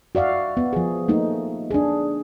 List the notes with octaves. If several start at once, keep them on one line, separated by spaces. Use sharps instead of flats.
F#4 D5 E5 F5
B3
F3 G#4
A3 A#3 D#4
D4 G#4